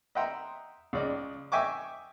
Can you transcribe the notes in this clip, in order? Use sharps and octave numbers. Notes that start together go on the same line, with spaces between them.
D#5 E5 F#5 G5 A#5 C6
C#2 D5 D#5
D#5 E5 G5 G#5 C#6 D6